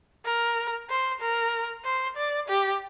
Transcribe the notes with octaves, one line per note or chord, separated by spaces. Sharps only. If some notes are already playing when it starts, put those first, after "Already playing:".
A#4
C5
A#4
C5
D5
G4